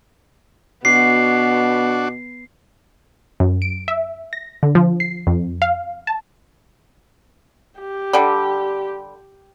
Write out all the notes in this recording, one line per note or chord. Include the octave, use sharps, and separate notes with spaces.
B2 B3 D4 F#4 C7
F#2
D7
E5
A#6
D3
F3
C7
F2
F5
A5
G4
D3 G3